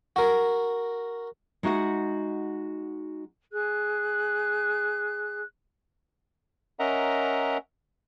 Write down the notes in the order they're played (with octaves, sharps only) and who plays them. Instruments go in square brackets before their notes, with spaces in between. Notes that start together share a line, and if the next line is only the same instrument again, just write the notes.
[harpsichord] F#4 A#4
[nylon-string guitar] G#3 D#4 F#4 E5 F#5
[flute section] G#4 F#6
[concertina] C#4 A#4 D#5 E5 F#5 A#5